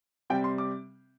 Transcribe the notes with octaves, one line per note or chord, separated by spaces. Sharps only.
C3 G3 C4 G5
C6
D6